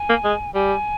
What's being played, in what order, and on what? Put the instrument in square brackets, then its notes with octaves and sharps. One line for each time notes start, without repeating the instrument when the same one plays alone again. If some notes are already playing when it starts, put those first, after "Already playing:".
Already playing: [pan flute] G#5
[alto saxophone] A#3
G#3
[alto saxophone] G3 [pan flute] G#5